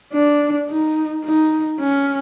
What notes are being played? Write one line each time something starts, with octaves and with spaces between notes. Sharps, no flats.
D4
D#4
D#4
C#4